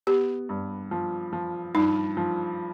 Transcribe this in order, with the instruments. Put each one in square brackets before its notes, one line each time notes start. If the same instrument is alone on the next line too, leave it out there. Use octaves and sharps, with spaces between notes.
[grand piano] B3 [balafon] G4
[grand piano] G2
F3
F3
[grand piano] G2 [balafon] D#4
[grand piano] F3